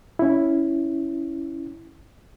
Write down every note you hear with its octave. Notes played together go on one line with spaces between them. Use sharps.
C#4 E4